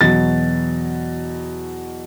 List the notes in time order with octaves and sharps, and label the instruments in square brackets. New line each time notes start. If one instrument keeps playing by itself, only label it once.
[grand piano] E2 B2 F#3 A6